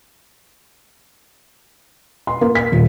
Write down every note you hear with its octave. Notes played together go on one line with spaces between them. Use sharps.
C6
A#3
B6
D#1